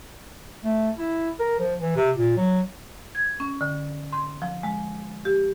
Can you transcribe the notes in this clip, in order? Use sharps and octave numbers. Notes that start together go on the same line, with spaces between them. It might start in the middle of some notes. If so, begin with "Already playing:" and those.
A3
E4
A#4
F3
E3
C3
A#2
F#3
G#6
C#4
D3
C6
F3
G#3
G4